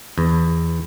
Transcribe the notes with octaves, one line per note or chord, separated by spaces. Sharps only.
E2